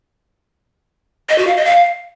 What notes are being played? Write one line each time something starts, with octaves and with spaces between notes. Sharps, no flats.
D#5
F#4
F5
D#5
F5